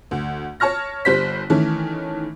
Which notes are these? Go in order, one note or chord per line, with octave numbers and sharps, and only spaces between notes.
D2
C#5 A5 C#6 F6 A#6
G1 G3 C5 B6
D#3 E3 A3 C#4